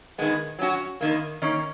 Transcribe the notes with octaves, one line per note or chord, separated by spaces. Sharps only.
D#3 G#3 B3
F#3 C#4 F#4
E2 D#3 A#3
D#3 A#3 C#4